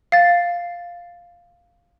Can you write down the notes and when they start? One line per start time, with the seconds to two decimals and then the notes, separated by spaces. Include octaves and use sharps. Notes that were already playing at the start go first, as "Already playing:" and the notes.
0.12 F5 A6